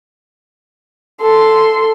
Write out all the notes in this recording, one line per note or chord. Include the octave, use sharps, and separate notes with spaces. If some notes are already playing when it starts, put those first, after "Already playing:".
A4 C6